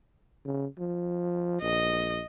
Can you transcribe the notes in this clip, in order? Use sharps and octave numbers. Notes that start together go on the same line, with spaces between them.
C#3
F3
A#1 D#5